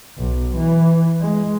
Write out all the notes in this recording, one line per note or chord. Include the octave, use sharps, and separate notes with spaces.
B1
E3
G#3